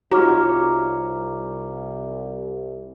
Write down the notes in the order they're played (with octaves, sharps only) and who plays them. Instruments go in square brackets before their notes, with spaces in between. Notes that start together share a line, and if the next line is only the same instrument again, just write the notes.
[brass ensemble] C2 [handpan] D#4 F4 C#5 [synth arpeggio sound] F#4 [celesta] A#5 D6 F6